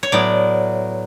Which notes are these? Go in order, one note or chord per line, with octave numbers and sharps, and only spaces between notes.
C#5
A2 F#3 B3 D5